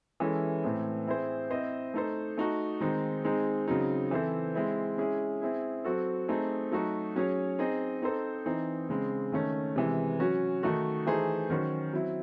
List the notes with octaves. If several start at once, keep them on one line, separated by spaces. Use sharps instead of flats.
E3 G#3 C#4 E4 A4
A2 E3 C4
C4 E4 G#4 C5
C4 E4 C5 D#5
A3 D#4 A4 C5
A3 D#4 F#4
D#3 G#3 C4 D#4
G#3 C4 D#4 G#4
C#3 F#3 C4 D#4
E3 C4 E4 A4 C5
G#3 C4 E4
G#3 C#4 E4 G#4
C4 E4 G#4
F#3 C4 F#4 A4
A3 C4 D#4 G#4
F#3 A3 D#4 F#4
F#3 C#4 G#4 C#5
C4 D#4 G#4 D#5
C4 D#4 A4 C5
E3 C4 D#4
C#3 G#3 C4
D#3 A3 C#4
C3 E3 G#3
F#3 C#4 F#4
D#3 A3 D#4 F#4
E3 A3 D#4 G#4 C5
D#3 F#3 C#4 F#4 C5
F#3 C4 E4